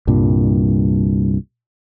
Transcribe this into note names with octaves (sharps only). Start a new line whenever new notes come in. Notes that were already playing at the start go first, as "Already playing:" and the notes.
C2 G2 A#2